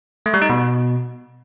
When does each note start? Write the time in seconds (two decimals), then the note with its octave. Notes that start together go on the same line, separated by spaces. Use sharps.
0.26 A3
0.34 G3
0.42 D#4
0.50 B2